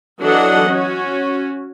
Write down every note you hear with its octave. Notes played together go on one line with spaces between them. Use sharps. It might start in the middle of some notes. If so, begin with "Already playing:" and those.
E3 F#3 D4 A4 D#5 F#5
C#4 F#4